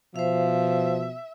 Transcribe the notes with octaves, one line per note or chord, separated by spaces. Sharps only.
B2 F3 C5 E5 F5